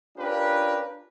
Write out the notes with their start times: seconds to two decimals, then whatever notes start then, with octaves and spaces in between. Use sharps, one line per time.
0.18 C#4 D4 F4 G4 A#4 B4